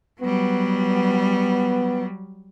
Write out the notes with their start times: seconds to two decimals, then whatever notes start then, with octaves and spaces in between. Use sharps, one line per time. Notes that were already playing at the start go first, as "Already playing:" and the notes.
0.21 F#3 G3 B3